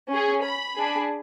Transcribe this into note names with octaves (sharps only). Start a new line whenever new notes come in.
C#4 G#4
B5
D4 G#4